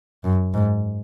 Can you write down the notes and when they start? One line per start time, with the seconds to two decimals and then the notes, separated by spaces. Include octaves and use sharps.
0.24 F#2
0.54 G#2